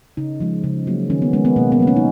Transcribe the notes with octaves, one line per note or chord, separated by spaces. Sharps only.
C#3 D#4
F3 G#3
C#3
F#3 A#3
D#3 C#4
B3
G#3 C#4
B3
B2 A#3
B3
F#3 A#3
C#4
D#4